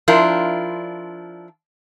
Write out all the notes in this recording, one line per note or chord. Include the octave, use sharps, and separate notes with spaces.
F3 D4 E4 F4 A#4